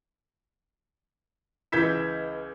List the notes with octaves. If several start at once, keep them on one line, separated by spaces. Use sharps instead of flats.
C#2 E3 G6 G#6 B6 E7